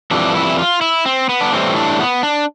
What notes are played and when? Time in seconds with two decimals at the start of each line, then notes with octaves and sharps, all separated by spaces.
0.11 F2 E3 G3 D4
0.35 E4
0.58 F4
0.81 E4
1.06 C4
1.29 B3
1.41 D4
1.52 A2 E3 G3 C4
1.76 D4
1.99 B3
2.23 D4